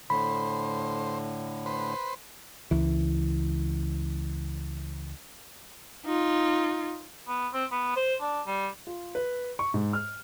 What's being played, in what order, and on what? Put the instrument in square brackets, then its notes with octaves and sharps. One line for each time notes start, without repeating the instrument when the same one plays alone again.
[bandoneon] A2 D3 [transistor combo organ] C5 [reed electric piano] B5
[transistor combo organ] B4 C5
[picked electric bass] C#2 E3
[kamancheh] D#4 F4
[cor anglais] B3
C4
B3
C5
D4
G3
[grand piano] F4
B4
C#6
G#2
F6